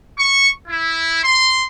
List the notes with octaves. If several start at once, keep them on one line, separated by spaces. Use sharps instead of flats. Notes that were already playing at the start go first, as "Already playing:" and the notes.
C#6
E4
C6